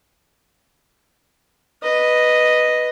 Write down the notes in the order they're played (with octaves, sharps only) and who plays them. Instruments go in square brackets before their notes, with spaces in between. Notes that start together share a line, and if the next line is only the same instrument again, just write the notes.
[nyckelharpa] B4 D#5